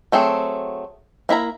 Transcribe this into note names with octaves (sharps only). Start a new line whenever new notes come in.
F#3 A3 C4 G#4
A#3 E4 E5 A#5